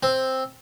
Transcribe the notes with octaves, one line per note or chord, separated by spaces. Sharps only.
C4